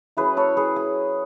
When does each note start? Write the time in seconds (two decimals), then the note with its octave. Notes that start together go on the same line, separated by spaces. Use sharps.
0.17 F#3 C#4 E4 G#4 B4
0.37 A4 C#5
0.57 G#4 B4
0.76 G#4